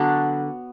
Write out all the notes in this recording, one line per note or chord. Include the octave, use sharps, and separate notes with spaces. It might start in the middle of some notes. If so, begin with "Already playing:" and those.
Already playing: D3 F#3 B3 D4